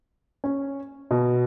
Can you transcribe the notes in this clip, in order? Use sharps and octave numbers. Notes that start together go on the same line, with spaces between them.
C#4
B2